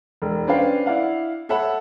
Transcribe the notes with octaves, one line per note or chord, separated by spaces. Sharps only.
E1
C#4 D4 B4 C5 F5 G5
E4 D5 F5 F#5
A4 C#5 E5 F#5 B5